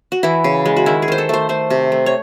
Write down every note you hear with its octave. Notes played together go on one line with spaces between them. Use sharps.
F#4
E3 E4
C#3
G#3
F#4
D#3 E4
G#4
D#3 C5
A4
A3 C5
A3 C5
C3
A3
C#5